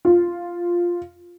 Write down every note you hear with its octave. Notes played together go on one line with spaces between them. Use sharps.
F4